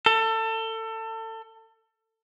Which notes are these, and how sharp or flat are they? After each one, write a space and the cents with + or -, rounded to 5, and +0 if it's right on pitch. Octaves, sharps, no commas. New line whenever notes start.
A4 +25